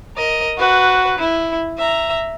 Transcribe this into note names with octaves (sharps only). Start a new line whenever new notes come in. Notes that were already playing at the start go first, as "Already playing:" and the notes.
A#4 D#5
F#4 B4
E4
E5 A#5